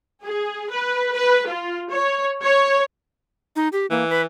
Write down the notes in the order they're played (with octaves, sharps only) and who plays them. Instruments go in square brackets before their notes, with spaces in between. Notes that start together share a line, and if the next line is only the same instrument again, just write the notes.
[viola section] G#4
B4
B4
F4
C#5
C#5
[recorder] D#4
G4
[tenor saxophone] E3 [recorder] A#3
[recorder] B4